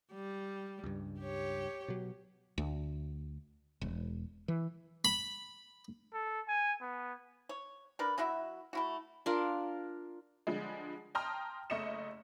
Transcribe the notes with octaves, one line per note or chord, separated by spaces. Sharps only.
G3
C#2 G2
G4 C#5
B2 F#3
D2
E1
E3
B5
A4
G#5
B3
C#5
D4 A#4 B4
F#3 E4 F#4 E5
A3 E4 F#4
D4 F4 A#4
D3 F3 G3 G#3
G5 A5 A#5 C6 D#6 F6
F#1 A3 D#5 C#7 E7